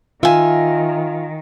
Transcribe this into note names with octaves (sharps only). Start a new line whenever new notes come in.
D#3 F4 E5 G#5